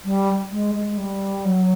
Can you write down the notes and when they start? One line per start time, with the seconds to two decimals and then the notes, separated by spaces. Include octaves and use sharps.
0.04 G3
0.51 G#3
0.75 G#3
0.97 G3
1.45 F#3